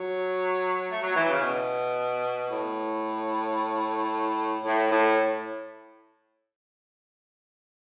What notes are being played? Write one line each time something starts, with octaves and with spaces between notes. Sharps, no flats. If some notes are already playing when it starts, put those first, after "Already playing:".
Already playing: F#3
A3
F#3
E3
C#3
B2
A2
A2
A2